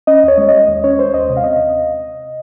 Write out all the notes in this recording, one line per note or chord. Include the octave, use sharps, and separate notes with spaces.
C#4 D#5
D#2
C#5
G#3
G#3 D#5
D#2
C#4 C#5
G#3 C5
D#2 D#5
C3 D#5
F5
C4 D#5
C3